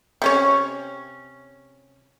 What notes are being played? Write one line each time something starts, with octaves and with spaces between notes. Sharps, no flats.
C3 C#4 C#5